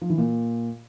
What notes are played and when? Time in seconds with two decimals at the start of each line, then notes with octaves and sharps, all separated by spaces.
0.02 F3
0.10 E3
0.18 A#2